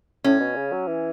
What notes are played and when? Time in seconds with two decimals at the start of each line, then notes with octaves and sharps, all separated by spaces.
0.24 A2 C#4
0.40 B2
0.56 C#3
0.72 F#3
0.87 E3